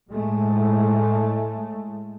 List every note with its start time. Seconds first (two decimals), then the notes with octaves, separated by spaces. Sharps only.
0.11 A2 G#3 A3